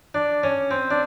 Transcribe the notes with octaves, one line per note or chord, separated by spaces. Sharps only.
D4
C#4
C4
D4